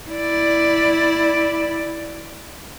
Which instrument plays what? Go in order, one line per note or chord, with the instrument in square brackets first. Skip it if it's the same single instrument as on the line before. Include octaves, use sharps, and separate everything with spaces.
[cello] E4 D5